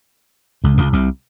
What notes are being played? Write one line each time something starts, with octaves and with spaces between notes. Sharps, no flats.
C#2 C#3
C#2 C#3
C2 C3